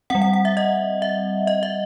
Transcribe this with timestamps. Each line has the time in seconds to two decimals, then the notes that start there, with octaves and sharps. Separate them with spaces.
0.10 G3 C4 F#5
0.22 F#5
0.33 F#5
0.45 E5
0.57 D#5
1.02 E5
1.47 D#5
1.63 E5